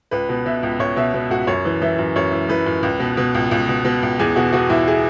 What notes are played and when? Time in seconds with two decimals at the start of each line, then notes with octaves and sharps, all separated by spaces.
0.11 C#2 B4
0.29 B2
0.46 B2 E5
0.63 C#2
0.79 C#2 C#5
0.96 B2 E5
1.14 B2
1.30 C#2 F#4
1.47 F#2 C#5
1.65 E3
1.82 E3 E5
1.99 F#2
2.16 F#2 C#5
2.33 E3
2.49 E3 B4
2.66 F#2
2.83 C#2
3.00 B2
3.17 B2
3.35 C#2
3.51 C#2
3.69 B2
3.85 B2
4.03 C#2
4.19 E2 G#4
4.36 B2 F#4
4.52 B2 F#4
4.70 E2 E4
4.87 G#4